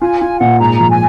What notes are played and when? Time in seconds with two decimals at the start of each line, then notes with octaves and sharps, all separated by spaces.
0.01 F4 G#5
0.20 F4 G#5
0.40 A#2 F#5
0.60 G#2 A#5
0.80 F3
0.90 G#5